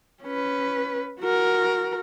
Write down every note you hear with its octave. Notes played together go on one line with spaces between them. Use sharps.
C#4 B4
F#4 A#4